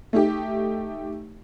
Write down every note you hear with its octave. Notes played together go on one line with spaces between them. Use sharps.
A3 D#4 G4